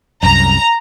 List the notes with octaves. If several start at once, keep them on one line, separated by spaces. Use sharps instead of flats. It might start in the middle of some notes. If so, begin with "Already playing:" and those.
C2 F#2 A#5